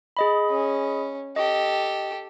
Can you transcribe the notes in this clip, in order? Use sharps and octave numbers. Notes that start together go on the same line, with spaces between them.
G#4 D#5 B5
C#4
G4 A4 D#5